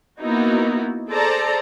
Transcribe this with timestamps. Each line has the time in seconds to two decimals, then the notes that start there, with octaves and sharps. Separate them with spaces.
0.20 A#3 B3 D#4 E4 F#4
1.11 G#4 A4 C5 D5 A5 A#5